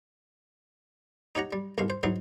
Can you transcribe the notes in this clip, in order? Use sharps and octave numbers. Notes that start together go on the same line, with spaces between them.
D#4 G4 C#5 F#5 A#5
G3
C2 G#2 B2 F5
C5
G#2 E3 F#3 D#4 C6